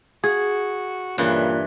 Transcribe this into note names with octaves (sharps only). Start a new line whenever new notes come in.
F#4 G#4
G2 A#2 C#3 E3